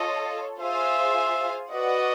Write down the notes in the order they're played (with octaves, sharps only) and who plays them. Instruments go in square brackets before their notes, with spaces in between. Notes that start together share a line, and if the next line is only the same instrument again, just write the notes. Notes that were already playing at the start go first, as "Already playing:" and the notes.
Already playing: [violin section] F4 A4 C#5 [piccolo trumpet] D#5
[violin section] F4 G#4 C5 F5 G#5 [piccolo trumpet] E5
[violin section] F#4 B4 D5 F#5 [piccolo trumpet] D#5